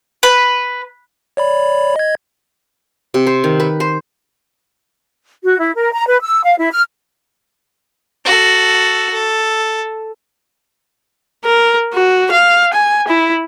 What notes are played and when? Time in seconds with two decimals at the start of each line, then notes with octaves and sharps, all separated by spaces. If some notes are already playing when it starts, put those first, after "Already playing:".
0.23 B4
1.37 C#5 D5 B5
1.96 D#5 G#6
3.14 C3
3.27 C5
3.44 D#3
3.60 B4
3.80 C5
5.44 F#4
5.58 E4
5.75 A#4
5.93 A#5
6.07 B4
6.22 E6
6.44 F5
6.59 E4
6.72 F6
8.25 F#4 A4
9.13 A4
11.45 A#4
11.94 F#4
12.31 F5
12.73 G#5
13.08 E4